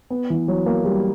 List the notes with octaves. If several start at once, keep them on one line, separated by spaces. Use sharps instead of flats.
B3
E3
F#3
A#3
G3